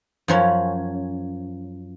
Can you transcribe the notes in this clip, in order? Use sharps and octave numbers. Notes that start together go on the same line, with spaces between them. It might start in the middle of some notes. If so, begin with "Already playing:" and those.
F#2 F3 C#4